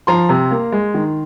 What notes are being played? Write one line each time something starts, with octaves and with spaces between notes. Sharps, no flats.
F3 A#5 C6
C3
A#3
G#3
D#3